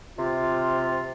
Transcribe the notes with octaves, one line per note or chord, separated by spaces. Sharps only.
C3 F4